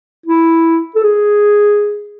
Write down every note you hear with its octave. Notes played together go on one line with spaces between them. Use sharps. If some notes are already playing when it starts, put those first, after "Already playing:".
E4
A4
G#4